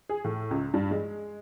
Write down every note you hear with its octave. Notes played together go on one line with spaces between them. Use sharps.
G#4
A2
C#2
G2
G#3